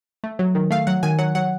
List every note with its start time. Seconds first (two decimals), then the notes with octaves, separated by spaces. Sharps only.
0.24 A3
0.39 F#3
0.55 D#3
0.71 A3 F5
0.87 F#3 F#5
1.03 D#3 G#5
1.19 F#3 F#5
1.35 F#3 F#5